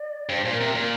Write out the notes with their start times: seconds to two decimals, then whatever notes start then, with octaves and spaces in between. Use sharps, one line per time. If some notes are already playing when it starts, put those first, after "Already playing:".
Already playing: D5
0.29 G2 C5
0.45 A#2
0.52 A#4
0.61 C3
0.75 A#2 A#4